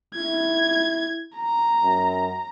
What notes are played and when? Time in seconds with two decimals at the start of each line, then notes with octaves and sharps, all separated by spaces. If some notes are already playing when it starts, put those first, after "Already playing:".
0.15 E4 G#6
1.36 A#5
1.82 F#2